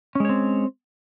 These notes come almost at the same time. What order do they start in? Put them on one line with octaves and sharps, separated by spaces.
C#4 G#3 C#5 C4